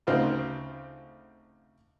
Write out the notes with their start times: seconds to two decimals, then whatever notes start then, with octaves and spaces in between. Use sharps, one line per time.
0.07 D2 C#3 C4 D#4 F4 F#4